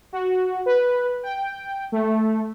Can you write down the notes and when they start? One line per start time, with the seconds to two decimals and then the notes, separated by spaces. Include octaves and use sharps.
0.13 F#4
0.66 B4
1.23 G5
1.92 A3